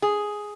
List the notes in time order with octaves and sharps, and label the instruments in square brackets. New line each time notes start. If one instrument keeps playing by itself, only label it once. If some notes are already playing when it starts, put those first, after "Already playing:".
[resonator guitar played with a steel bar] G#4